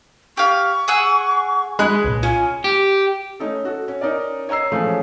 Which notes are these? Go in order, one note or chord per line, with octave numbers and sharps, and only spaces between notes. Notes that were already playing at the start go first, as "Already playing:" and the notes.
G4 F5 C#6
G#4 F#5 E6
G#3 G#4 B5 F#6
C2 A#2
C#4 F4 G#5
G4
A3 C#4 D#4 A4
F#4 A4
C#4
C#4 D#4 A#4 D5
C#5 D#5 A#5 E6 C7
E3 F3 G#3 A3 C#4